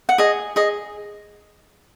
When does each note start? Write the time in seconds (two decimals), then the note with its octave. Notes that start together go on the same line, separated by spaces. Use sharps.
0.09 F#5
0.18 G#4 D#5
0.56 G#4 D#5